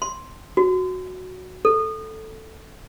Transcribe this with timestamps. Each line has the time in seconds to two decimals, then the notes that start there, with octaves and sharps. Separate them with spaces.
0.02 C6
0.57 F#4
1.65 A4